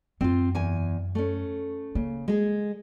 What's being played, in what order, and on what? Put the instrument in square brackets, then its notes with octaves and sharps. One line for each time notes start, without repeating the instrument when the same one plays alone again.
[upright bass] F#2 [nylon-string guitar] C4 F4
[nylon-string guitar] E2 G#5
A3 C#4
[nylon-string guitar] C#3 [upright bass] A#3
[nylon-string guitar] G#3 G#4